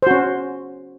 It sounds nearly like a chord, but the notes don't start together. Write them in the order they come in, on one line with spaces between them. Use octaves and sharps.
C5 F#4 C#4